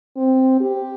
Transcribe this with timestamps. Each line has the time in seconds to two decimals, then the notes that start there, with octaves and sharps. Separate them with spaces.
0.17 C4
0.61 G4